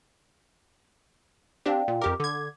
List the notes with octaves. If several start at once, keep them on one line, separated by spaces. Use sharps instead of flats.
C4 D4 G4 D5 F5 G5
A#2
F2 G4 A#4 D6
D3 D6 G#6